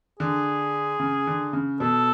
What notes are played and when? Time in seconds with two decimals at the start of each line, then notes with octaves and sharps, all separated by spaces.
0.20 D3 G#4
1.00 C#3
1.27 D3
1.53 C#3
1.80 B2 A4